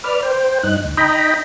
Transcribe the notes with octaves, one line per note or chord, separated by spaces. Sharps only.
B4 D5 F6
C5 G5
G2 D#4 F#6
D2
D#4 D#5 G5 A#5 B5